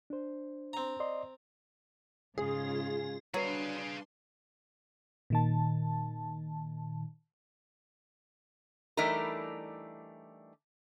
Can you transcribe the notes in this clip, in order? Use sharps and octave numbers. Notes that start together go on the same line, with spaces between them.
D4 C5
C4 A#5
D5 D#5 C6
G#2 C#3 F4 G#4
F#3 G3 D4 G#4 B4 F5 C6
A#2 D#3 A5
E3 G3 A3 D4 D#4 A#4